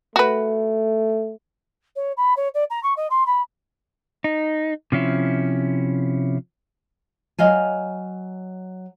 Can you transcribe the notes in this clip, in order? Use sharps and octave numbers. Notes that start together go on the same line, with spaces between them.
A3 F#4 B4
C#5
B5
C#5
D5
A#5
C#6
D#5
C6
B5
D#4
C3 F3 C#4 E4
F#3 D#5 F5 G#5